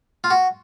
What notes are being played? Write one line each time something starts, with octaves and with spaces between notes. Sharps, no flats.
F4
F#4